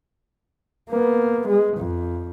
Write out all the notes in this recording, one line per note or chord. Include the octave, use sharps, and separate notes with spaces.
A#3 B3
G#3
F2